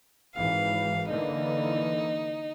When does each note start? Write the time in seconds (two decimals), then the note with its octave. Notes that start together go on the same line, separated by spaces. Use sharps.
0.35 G#1 E3 F5
1.09 D3 E3 A#3 D#4